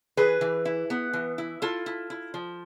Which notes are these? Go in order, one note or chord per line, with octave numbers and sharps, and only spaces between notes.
E3 G#4 B4
E3
E4
B3
E3
E4
E4 F4 A4
E4
E4
F3